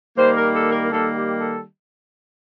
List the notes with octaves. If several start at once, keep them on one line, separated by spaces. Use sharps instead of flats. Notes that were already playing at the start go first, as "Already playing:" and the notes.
D#3 G3 A#3 C5
A#4
A4
A#4
D#3 G3 A#3 A4
G4
A4